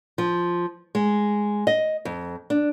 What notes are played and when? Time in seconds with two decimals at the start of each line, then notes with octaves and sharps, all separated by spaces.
0.18 F3
0.95 G#3
1.67 D#5
2.05 F2
2.50 D4